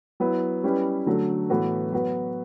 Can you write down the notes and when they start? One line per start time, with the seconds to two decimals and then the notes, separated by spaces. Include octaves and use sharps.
0.20 F#3 B3 E4
0.64 G3 C#4 E4 G4 B4
1.06 D3 F#3 A3
1.50 A2 E3 B3 F#4 B4
1.92 F#3 B3 F#4 B4